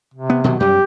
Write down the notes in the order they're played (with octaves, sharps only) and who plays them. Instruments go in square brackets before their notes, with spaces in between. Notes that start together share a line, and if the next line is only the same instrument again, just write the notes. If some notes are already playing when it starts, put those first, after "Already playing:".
[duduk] C3
[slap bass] B3
B2 D#3 F#3
[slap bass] F#2 G3 [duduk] G4